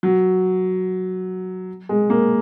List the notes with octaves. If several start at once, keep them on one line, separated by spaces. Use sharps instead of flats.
F#3
G#3
A#3